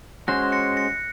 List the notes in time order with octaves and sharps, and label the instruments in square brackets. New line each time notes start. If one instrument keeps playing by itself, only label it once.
[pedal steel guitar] G#3 C#4 F#4 C5 [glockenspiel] F#6 A#6
[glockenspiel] A#6 C#7
A#6 C#7